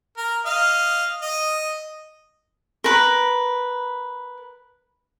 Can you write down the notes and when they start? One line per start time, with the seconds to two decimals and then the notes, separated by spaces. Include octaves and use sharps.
0.17 A#4
0.45 D#5 F5
1.22 D#5
2.84 A#4 B4 B5